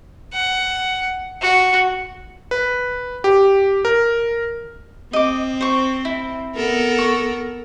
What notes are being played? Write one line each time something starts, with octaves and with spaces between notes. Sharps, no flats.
F#5
F#4
B4
G4
A#4
C4 D#5 D6
C5 C#6
E4
B3 A4 A#4
C#6